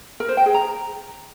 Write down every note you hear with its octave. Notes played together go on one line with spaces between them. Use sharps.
A#4
C5
G5
G#4
A#5